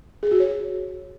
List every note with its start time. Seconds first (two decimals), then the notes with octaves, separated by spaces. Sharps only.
0.23 G#4
0.31 F#4
0.40 C#5